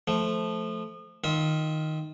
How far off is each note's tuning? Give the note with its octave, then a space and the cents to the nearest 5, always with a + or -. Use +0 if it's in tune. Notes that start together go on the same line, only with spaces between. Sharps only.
F3 +0 A3 -10
D#3 +0 F4 +0 E5 -30